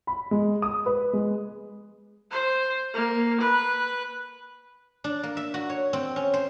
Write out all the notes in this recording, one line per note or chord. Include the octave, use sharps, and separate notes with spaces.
B5
G#3
D#6
B4
G#3
C5
A#3
B4
D4
A#3
E5
F#4
C#5
C4
C#4
C5